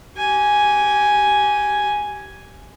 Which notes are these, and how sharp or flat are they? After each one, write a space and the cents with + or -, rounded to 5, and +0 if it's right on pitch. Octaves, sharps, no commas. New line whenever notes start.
G4 -25 G#5 +0